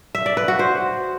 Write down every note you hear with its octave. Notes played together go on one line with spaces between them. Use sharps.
E5
D5
B4
F#4
C5